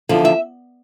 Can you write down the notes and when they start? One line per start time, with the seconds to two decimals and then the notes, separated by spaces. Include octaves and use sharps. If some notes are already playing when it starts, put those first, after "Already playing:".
0.09 E2 D3 F3
0.25 E5